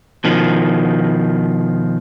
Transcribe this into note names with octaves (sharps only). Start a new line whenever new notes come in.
B2 D#3 F3